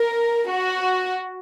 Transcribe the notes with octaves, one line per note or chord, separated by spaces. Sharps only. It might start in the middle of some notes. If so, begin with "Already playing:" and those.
Already playing: A#4
F#4